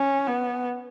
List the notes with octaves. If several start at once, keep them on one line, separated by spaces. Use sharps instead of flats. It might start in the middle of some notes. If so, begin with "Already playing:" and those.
Already playing: C#4
B3